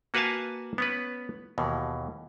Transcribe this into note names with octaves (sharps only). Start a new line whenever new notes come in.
A#3 F#4 B4 F5 G#5 A5
B3 C#4 B4
D#2 B2 E3